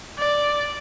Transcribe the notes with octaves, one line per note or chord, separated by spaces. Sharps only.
D5